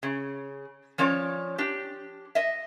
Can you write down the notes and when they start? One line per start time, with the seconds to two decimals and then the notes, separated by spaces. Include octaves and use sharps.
0.03 C#3
0.98 F3 C#4 C#5 D5
1.58 D4 G4
2.35 D#5 E5